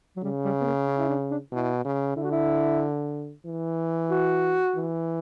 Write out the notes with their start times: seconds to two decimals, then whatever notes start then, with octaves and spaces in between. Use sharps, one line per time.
0.16 F#3
0.23 C#3 G3
0.45 G3
0.61 B3
0.66 A#3
0.88 C#4
0.98 E4
1.09 D4
1.31 D4
1.52 B2 E4
1.85 C#3
2.16 D3 E4
2.24 F#4
2.31 E4
3.46 E3
4.10 F#4
4.75 E3